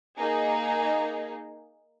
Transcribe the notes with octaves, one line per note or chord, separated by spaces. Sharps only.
A#3 D#4 G#4